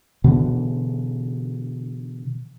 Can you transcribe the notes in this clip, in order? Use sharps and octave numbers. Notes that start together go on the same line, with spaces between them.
B2 D3 E3